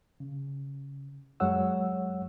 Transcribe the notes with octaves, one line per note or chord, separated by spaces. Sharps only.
C#3
F#2 F#3 G#3 C#5 F#5 E6